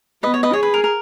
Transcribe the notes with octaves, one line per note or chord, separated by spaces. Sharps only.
B3 B4 D#5
C#5
B4 D#5
G#4 C#5
B4
A#4
A#4